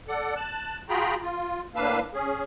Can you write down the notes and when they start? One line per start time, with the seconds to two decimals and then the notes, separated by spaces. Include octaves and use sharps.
0.08 A4 D5 F#5
0.36 A5 F#6
0.89 F4 F#4 G#4 G5 A#5 B5
1.23 F4
1.76 A2 A#3 D4 B4 F5 E6
2.14 C#4 G#4